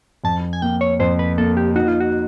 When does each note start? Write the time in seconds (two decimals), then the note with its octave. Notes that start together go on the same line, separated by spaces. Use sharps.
0.24 F2 A5
0.53 G#5
0.62 A#3 G5
0.81 C#5
1.00 F2 C5
1.19 B4
1.38 A#3 A4
1.57 G4
1.75 D#4 F#4
1.88 F4
2.00 F#4